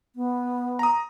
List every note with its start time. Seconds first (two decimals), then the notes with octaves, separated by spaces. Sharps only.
0.16 B3
0.79 A#5 D#6